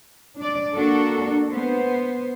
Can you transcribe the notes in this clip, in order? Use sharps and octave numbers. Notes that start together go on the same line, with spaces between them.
D4 D5
A#3 D4 F#4 A4
B3 C5